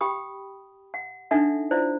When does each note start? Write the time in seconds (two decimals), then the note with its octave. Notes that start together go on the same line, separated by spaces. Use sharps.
0.01 G4 G5 B5 D#6
0.94 F#5
1.31 D4 D#4 A4 E5 F#5
1.71 E4 F4 C5 D5